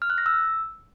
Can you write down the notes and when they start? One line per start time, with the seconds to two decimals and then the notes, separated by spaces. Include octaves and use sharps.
0.02 F6
0.10 F#6
0.18 A#6
0.26 E6